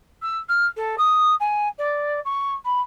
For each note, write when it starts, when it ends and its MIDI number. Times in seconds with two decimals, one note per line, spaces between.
0.22 0.38 88
0.49 0.66 89
0.76 0.95 69
0.98 1.34 87
1.40 1.69 80
1.78 2.20 74
2.25 2.54 85
2.65 2.81 83